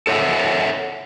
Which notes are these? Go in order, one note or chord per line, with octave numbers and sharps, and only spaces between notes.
A4 C#5 E5 F#5